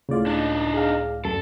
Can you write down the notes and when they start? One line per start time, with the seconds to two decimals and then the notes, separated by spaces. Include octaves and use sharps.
0.09 C#2 A2 C#3 F4 D5
0.26 D4 D#4
0.74 G#4 F5
1.25 F#2 A4